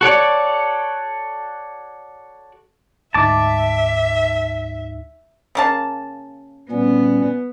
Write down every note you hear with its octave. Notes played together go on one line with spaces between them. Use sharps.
F#4 A4 C#5 D5
D2 G#2 D#4 E5 A5 D6
C#3 A#3 A5
A#2 G3 B3 C#4